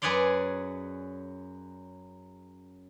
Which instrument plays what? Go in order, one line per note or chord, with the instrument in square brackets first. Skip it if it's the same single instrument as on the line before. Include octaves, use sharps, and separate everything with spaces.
[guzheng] F#2 G#4 B4 C#5 D5 C6